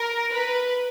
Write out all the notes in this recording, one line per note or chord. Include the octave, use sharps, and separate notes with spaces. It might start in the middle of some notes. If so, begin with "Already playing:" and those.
Already playing: A#4
B4